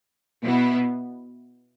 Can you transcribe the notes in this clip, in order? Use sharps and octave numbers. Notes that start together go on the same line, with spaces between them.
B2 B3 E4